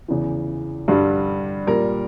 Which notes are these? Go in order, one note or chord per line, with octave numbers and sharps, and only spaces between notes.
E2 C#3 E3
G2 D3 G3
A#2 G3 A#4